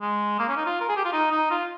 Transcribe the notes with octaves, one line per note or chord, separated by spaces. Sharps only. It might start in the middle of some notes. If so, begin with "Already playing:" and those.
G#3
A#3
C#4
D#4
F4
A#4
G#4
G4
F4
D#4
D#4
F4